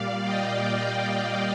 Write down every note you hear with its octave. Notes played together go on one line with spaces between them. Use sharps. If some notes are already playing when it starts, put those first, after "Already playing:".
Already playing: A#2 G3 D5 F5
D#5 G5
D5 F5